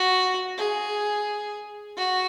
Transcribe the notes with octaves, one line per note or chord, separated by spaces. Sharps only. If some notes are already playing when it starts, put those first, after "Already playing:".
Already playing: F#4
G#4
F#4